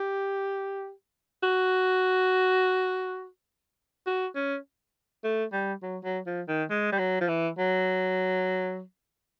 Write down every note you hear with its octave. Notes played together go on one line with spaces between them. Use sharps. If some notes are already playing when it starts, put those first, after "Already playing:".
Already playing: G4
F#4
F#4
C#4
A3
G3
F#3
F#3
F3
D#3
G#3
G3
F#3
F3
E3
F#3